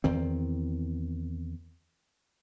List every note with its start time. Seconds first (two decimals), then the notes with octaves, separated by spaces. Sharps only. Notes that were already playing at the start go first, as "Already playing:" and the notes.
0.04 E2 D#3 C4